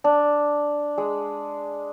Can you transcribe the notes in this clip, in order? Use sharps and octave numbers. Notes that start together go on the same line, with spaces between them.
D4
G#3